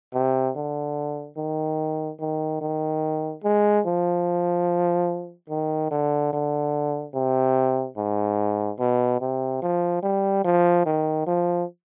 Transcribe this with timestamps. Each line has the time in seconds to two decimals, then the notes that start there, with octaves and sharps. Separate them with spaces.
0.14 C3
0.56 D3
1.37 D#3
2.20 D#3
2.61 D#3
3.44 G#3
3.86 F3
5.50 D#3
5.91 D3
6.33 D3
7.14 C3
7.97 G#2
8.79 B2
9.21 C3
9.62 F3
10.03 G3
10.45 F3
10.86 D#3
11.27 F3